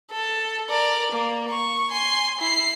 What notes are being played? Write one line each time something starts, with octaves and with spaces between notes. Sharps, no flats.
A4
A#4 D5
A#3
C#6
G#5 C6
E4 C7